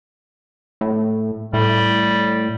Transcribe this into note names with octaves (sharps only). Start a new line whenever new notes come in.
A2
A2 G3